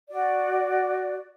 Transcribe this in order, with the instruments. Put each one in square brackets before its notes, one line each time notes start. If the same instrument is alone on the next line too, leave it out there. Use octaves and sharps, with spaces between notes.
[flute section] F#4 D5